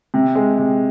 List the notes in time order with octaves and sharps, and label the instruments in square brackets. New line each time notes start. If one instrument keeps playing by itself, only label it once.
[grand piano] C3
G#3
C3